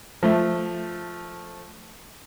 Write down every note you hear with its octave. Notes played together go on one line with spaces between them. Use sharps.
F3 A3